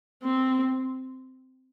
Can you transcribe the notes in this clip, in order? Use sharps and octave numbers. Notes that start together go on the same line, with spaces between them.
C4